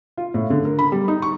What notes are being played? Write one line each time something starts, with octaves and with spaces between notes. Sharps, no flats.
F4
A2
D3
A#4
B5
G3
D#4
C#6